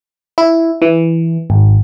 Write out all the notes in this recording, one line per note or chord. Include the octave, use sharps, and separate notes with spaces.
E4
E3
G#1